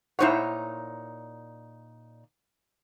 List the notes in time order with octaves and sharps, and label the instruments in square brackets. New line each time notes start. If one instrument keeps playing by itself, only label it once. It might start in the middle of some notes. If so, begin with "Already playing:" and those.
[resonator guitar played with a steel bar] A#2 D#4 C#5 [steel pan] E4 C5 F#5